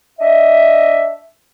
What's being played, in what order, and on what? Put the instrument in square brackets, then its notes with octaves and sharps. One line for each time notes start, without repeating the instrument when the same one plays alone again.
[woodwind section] D4 D#5 E5